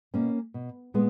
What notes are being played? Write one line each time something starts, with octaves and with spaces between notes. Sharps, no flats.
B2 A#3 C#4
B2
A#2 G#3 B3